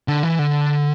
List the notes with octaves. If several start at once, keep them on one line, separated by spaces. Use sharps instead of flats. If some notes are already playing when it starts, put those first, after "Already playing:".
D3
E3
D3